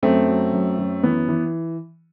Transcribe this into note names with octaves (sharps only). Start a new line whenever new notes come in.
F#2 A3 C4
F#3
F#2
F#2
E3 B3
E3